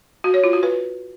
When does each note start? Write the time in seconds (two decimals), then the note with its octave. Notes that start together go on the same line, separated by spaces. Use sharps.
0.24 F#4
0.34 C#5
0.44 F4
0.53 F#4
0.63 B4